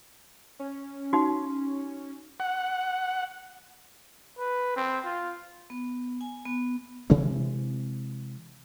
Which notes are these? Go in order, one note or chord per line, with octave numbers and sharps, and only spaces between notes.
C#4
D#4 F#4
F#5
B4
C4
F4
B3
G#5
B3
C3 E3 G#3 C4